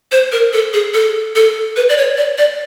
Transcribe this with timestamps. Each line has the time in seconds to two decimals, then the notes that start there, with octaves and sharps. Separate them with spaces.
0.12 C5
0.32 A#4
0.53 A4
0.73 G#4
0.94 A4
1.36 A4
1.76 B4
1.89 D5
1.98 C#5
2.17 D5
2.38 D5